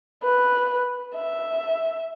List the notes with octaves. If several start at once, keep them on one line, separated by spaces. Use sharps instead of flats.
B4
E5